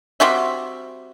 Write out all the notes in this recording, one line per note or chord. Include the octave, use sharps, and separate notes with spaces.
G3 C4 F#4 E5